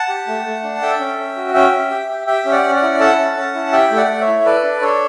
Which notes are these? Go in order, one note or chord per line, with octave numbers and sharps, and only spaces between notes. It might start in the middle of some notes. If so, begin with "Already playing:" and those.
Already playing: F#5 A5
G4
A3
A3
D4
A4 E5 G5
C#4
C#4
F#4
C#4 E5 G5
C#4
G4
G4
G4 E5 G5
C#4
D5 F#5
C#4
D5 F#5
E4
A4 F#5 A5
C#4
C#4
E4
G4 E5 G5
A3
D5 F#5
A3
C#5 E5
E4
A4 B4 D5
D4
D4 A4 C#5